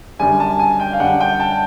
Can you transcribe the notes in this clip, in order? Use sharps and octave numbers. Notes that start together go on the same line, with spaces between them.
F#2 D3 G3 G#5
A5
G#5
G5
F5
F#2 D3 G3 F#5
G5
A5